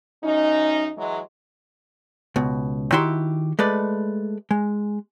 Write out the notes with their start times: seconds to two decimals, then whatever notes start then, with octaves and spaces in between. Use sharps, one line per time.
0.22 F#2 C#4 D#4
0.96 E3 F#3 G#3
2.36 C#2 B2
2.92 D#3 E4 F#4 G4 E5 C6
3.59 G#3 A3 B4 D5
4.51 G#3